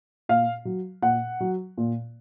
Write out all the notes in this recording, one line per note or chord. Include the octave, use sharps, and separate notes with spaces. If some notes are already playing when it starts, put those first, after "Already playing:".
A#2 F5
F#3
A#2 F#5
F#3
A#2